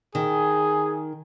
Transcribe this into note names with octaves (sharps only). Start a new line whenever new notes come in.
D#3 G#4